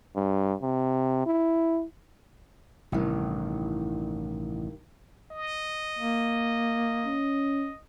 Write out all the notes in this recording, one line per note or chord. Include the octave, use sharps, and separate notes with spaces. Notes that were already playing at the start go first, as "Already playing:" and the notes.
G2
C3
E4
A1 G2 C3 D#3 E4
D#5
A#3
C#4